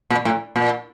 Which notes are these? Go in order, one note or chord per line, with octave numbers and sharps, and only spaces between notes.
A#2
A2
A#2